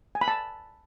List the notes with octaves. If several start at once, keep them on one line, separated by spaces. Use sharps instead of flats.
G#5
B5
A5